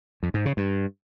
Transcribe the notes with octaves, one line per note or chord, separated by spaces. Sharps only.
F2
G#2
C#3
G2